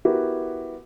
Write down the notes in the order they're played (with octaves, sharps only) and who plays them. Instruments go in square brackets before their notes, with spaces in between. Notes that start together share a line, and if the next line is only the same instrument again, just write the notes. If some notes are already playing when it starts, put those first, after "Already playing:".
[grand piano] B3 E4 F#4 G4 A#4